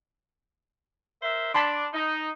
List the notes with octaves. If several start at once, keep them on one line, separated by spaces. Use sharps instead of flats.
A#4 C5 E5
D4 A5 B5 C6
D#4